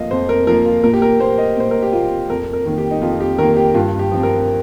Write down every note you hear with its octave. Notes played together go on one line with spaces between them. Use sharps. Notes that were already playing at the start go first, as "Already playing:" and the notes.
Already playing: F2 F3 A#3 D#5 F5
F2 C5
A#4
F3 A#3 A#4
F4
A#2 A#4
G4
A#4
A#3 C5
D#5
A#2 C5
A#4
G4
A#3 F4
F2 A#4
A#4
D#3 A#3
G4
D#4
F2 F4
G4
D#3 A#3 A#4
G4
G2 F4
G4
F3 C4
A#4